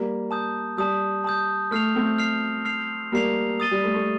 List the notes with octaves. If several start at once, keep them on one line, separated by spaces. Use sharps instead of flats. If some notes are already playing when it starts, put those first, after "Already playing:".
Already playing: G3 A#3
A5 D#6 G6
G3 A5 D#6 G6
A5 D#6 G6
A3 F6 C7 F7
A3 C4
F6 C7 F7
F6 C7 F7
G3 A#3 F6 C7 F7
D#6 A6 D#7 G7
G3
A3
A3